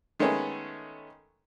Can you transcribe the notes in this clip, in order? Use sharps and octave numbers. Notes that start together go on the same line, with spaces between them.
D#3 G#3 A3 B3 C#4